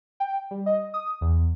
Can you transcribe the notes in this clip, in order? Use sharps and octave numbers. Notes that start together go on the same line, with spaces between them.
G5
G3
D#5
D#6
E2